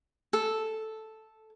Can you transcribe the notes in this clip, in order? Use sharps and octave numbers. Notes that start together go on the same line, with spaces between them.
A4